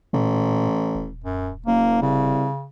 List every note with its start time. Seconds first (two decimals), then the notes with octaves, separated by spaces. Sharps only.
0.13 A1 A#2
0.95 D#1
1.24 F#2
1.66 F#1 A#3
2.02 C2 C#3